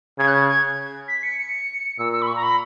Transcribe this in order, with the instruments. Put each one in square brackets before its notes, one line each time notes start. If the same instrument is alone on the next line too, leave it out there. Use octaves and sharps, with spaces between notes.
[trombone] C#3 [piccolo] G#6
[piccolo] F#6
G#6
G#6
B6
C#7
C#7
[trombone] A#2 [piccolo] E6
[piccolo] E6
B5
C#6
A#5
B5